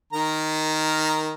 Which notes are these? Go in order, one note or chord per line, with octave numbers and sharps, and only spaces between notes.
D#3 A#4 A#5